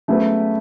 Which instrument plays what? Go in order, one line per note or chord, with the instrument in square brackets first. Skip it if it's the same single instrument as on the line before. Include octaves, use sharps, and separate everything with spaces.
[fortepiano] C#3 F#3 B3 F#4 B4 [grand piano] A3